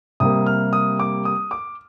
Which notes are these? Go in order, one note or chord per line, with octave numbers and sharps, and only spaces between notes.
C3 G3 A#3 D#6
F6
D#6
D6
D#6
D6